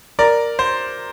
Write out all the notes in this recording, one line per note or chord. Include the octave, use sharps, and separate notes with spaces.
A#4 D5
C5